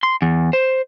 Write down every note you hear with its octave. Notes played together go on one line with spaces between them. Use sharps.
C6
E2
C5